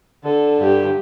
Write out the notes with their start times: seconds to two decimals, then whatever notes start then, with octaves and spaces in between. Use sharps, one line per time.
0.24 D3 A4
0.60 G2 G4